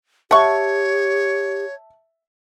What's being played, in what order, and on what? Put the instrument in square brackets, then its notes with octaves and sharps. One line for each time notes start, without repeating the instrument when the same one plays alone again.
[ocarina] G4 [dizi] C#5 [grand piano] E5 A5 [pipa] F#5 C#6